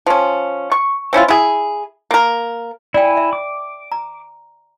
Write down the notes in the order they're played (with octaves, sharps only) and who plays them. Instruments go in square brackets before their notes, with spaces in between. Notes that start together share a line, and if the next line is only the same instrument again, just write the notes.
[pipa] F3 C#4
C#6
C4 C#4 E4 F4
E4 G#4
A#3 A#4
[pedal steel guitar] E4 G#5 [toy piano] D5 G5
[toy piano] E5
[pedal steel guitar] D6
[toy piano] A#5